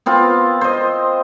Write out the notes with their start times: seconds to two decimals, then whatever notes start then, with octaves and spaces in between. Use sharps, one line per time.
0.06 B3 C4 F4
0.61 C5 D#5